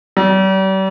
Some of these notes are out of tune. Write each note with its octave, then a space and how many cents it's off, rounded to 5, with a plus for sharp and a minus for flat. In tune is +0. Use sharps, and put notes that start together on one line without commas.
G3 -40